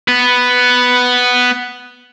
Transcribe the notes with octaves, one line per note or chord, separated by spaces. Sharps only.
B3 B4